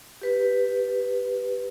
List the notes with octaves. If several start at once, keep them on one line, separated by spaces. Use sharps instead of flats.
G4 B4